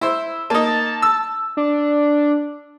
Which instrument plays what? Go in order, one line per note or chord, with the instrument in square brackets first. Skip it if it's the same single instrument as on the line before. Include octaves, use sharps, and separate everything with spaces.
[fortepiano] E4 C5
[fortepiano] A#3 D#4 [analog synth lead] A5
[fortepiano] E6
[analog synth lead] D4